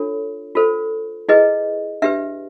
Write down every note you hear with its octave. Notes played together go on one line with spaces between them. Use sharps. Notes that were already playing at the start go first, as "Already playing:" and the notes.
Already playing: D4 F4 A4 C#5
F4 A4 C5
E4 G#4 B4 D#5
D4 G4 B4 E5